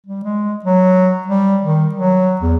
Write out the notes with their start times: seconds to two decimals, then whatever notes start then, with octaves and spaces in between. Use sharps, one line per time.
0.07 G3
0.24 G#3
0.64 F#3
1.27 G3
1.63 D#3
1.94 F#3
2.41 E2